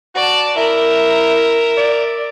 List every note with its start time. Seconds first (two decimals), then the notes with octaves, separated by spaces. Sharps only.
0.15 F#4 D5 A5
0.56 E4 A#4 E5
1.77 D5